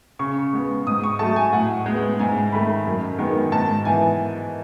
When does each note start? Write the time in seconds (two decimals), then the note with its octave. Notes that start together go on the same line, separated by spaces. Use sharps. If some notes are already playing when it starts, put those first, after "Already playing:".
0.19 C#3 C#6
0.53 G#3 B3
0.86 G#2 D#6
1.04 C#6
1.19 F#3 A3 A5
1.36 G#5
1.52 A2 F#5
1.86 G#3 B3
2.19 G#2 G#5
2.52 D#3 A3 B5
2.86 F#2
3.18 D#3 G#3 B3
3.52 G#2 A5
3.85 E3 B3 G#5